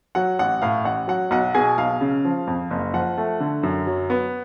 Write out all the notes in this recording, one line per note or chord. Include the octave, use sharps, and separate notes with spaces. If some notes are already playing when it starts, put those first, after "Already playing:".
F#3 F#5
A1 F#5
A2 F5
A1 F#5
F#3 F#5
B1 F#5
B2 G#4 G#5
B1 F5
C#3
F3
F2
F#1
F3 F#5
A3
D3
F#2
F#3
B3